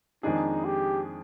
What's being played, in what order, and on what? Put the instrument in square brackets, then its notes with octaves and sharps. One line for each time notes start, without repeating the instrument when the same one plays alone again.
[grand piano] F2 D#3 G#3 D4 G#4 [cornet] D#4
[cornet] G4